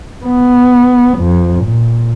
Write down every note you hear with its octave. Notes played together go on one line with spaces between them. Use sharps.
B3
F2
A#2